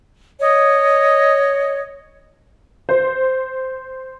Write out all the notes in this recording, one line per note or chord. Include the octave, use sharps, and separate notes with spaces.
C#5 D#5
C5